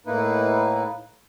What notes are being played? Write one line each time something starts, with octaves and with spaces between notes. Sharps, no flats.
A2 A#3 D#4 E4 B4